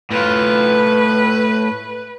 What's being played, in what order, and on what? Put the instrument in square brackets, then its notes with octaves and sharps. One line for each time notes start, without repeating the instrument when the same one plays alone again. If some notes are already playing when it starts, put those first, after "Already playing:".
[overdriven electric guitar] A2 F4 [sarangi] B4